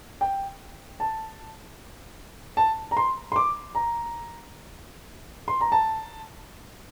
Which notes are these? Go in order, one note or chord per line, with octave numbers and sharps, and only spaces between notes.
G5
A5
A5
A#5
C6
C6
D6
A#5
C6
A#5
A5